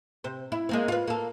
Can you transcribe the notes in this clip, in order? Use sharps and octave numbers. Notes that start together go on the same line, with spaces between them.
C3 C5
E4
G#3 A#3 C4
F4 B4
A#3 A4